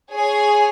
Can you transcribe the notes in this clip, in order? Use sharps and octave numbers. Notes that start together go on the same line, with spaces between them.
G#4 C#5 G#5